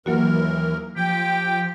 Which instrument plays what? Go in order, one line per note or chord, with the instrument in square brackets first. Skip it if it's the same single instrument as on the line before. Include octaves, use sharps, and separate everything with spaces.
[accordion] D#2 A#4 [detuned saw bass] E3 [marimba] F#3 A#3 F#4
[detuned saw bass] F3 [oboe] G4 [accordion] G5